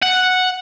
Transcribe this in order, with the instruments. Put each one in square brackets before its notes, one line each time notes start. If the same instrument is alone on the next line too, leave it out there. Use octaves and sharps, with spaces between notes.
[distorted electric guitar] F#5